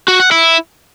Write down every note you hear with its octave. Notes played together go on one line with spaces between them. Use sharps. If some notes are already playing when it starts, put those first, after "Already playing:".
F#4
F#5
E4